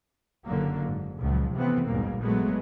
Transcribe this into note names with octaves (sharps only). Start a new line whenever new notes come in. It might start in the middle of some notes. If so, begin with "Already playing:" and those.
F#1 F#2 D3 F#3 A#3
G#2
C#2 A#2 F3 F#3
C3 E3 F3 A3 B3 C4
A#1 D#2 G#2 B2 G3 A#3
A#2 F#3 G#3 A3 B3